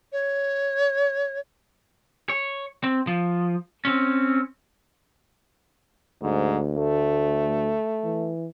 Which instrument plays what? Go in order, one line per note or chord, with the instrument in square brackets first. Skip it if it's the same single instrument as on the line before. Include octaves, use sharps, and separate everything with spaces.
[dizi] C#5
[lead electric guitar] C#5
C4
F3
C4 C#4
[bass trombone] D2 [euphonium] G#2
[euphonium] A3
[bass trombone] E3